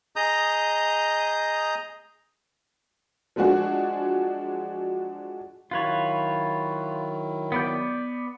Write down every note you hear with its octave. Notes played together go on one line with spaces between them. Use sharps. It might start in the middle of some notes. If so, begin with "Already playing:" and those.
G#4 D#5 A#5 D#6 G6
F3 F#3 G#3 D4 F#4 G#4
D#3 F#3 E4 F4 B4 C#5
B3 D5 G6